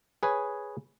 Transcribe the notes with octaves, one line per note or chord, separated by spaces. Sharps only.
G#4 B4 C#5 G#5